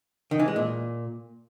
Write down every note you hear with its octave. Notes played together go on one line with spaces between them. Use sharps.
D#3
E3
G#3
A#2